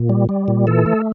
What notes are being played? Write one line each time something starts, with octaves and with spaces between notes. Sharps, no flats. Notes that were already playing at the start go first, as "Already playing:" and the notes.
Already playing: A#2
G3
G3
A#2
E3 A4
A3